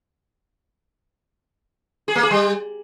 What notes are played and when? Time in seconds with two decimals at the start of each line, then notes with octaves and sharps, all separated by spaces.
2.08 G#4
2.15 A#3
2.23 G#4
2.31 G3